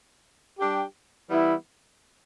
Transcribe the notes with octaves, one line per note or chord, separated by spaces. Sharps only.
G3 D4 G4
E3 G3 B3 E4